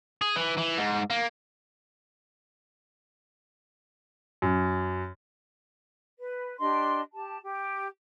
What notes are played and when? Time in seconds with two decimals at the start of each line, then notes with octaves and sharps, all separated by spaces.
0.21 G#4
0.36 E3
0.57 E3
0.78 G#2
1.10 A#3
4.42 F#2
6.19 B4
6.59 D4 G4 D#5 C6
7.13 G4 A5
7.42 G4